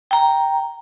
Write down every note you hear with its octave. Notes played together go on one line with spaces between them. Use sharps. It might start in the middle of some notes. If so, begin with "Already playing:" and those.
G5 A#5